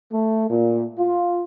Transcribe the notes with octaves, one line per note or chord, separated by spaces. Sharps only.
A3
A#2
F4